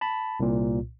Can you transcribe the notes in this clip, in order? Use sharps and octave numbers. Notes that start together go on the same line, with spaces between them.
A5 B5
C2 A#2